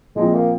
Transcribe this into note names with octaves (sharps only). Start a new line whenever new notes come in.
A#2 F3 G#3 C4
A#3